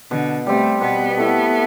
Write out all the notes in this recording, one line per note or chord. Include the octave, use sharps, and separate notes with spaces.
B2 D3
G3 A3 C4
B2 B3
A3 E4